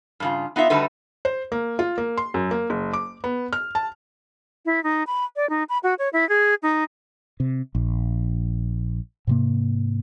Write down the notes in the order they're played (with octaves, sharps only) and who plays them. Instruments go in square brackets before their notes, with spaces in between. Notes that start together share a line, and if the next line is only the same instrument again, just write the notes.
[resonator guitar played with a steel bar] G2 C#3 F4
B3 D#4 F4 E5
D3 G3 A3 D#4 F#4 B4
[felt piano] C5
A#3
F4
A#3
C6
F#2
A#3
F#1
D6
B3
F6
A5
[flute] E4
D#4
B5
D5
D#4
B5
F#4
C#5
E4
G#4
D#4
[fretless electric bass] C3
A#1
G#2 C3 A#3